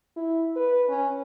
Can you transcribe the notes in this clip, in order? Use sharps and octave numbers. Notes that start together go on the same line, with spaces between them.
E4
B4
C#4